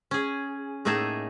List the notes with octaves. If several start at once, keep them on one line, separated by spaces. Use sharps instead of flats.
C#4 G#4
A2 A3 A#3 D#4 G#4 A5